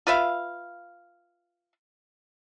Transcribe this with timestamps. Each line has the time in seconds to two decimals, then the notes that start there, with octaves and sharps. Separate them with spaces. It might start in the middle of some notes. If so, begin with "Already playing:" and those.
0.07 F4 B4 E5 F5